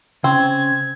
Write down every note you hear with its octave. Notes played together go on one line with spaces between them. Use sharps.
C#3 C4 G#6